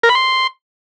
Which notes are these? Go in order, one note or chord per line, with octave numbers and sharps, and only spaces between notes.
A#4
B5
C6